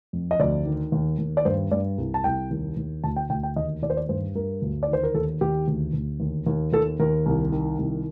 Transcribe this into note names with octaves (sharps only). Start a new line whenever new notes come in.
F2
D#5
D2 D5
D#3
D#2
D#2
D5
G2 C5
G2 D5
C2
A5
C2 G5
D#2
D#2
D2 A5
G5
D2 G5
G5
D#2 D#5
D#2 D5
C5
D5
G2 C5
G2 A#4
D2
D5
D#3 C5
A#4
D#2 A4
D#2 G4
D2
D2
D#2
D#2
D#2 A4
D#2 A#4
C2
D#3
C2